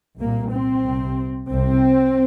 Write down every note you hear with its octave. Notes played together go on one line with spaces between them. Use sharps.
C2 A#2 A#3
C4
C2 C3
C2 C3 C4